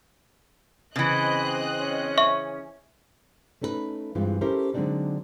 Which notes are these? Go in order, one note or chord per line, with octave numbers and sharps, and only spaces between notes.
C#3 E3 C4 B4 D#5 F#6
C#4
E5 C#6
A3 C#4 D#4 A4 B4
G2 E3 G#3 C4 F4
C#4 E4 G4 A4 A#4 C5
D3 F#3 G#3 C4 D4 D#4